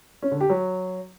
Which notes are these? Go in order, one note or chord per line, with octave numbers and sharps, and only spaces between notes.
C#4
D3
G4
F#3